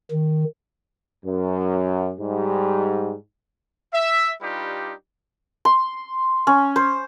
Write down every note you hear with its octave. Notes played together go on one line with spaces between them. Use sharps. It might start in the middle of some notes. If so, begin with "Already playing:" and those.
D#3
F#2
G#2 G3
E5
G3 D4 D#4 F4 G4 B4
C6
C#4
C5